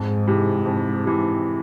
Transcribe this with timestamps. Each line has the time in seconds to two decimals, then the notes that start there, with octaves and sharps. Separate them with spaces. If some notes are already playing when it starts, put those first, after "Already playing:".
Already playing: F2 G#2
0.28 C3 E3
0.66 F2
1.05 C3 E3